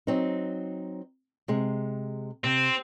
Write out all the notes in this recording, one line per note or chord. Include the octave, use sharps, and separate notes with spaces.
F#3 C4 D#4
C3 G#3
C3 C4